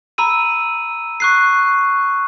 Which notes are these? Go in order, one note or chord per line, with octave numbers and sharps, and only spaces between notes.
A#5 B5 E6 D#7
C#6 F#6 C7